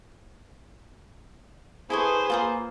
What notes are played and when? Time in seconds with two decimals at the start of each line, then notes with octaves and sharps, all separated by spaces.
1.90 E4 G#4 A4 B4 C5 C#6
2.30 A#3 F4 G#4 D#6